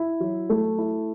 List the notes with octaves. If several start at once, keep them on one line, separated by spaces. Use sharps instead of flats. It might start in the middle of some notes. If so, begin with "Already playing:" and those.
Already playing: E4
F#3
A3
E4